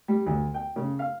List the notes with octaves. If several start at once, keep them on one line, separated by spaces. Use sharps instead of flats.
G3
D2
G5
C#3
F5